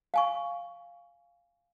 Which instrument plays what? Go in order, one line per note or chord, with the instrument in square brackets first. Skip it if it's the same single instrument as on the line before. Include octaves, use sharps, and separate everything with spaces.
[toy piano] F5 G#5 C#6